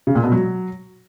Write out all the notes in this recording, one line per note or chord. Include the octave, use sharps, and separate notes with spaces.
C#3
A#2
B2
F#3